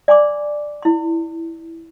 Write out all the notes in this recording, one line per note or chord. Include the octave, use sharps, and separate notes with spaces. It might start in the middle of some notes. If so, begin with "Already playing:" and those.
D5 G#5 C6 D6
E4 C6